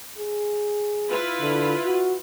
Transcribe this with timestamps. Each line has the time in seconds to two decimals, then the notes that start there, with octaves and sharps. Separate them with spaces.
0.18 G#4
1.09 E4 F4 B4
1.41 D3
1.85 F#4